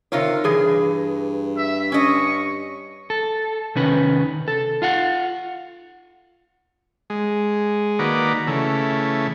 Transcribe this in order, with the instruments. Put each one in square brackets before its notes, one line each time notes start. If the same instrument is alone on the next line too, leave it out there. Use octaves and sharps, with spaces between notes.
[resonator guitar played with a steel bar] C3 F4 C#5 [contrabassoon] D#3
[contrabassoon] G2 [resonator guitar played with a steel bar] E3 G#4
[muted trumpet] E5
[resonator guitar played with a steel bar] C#4 D#5 [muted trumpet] C#6
[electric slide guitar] A4
C3 D#3 C#4 B4
A4
F4 F5 F#5
[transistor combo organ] G#3
D#3 A#3 F#4 B4 D5
C#3 E3 A3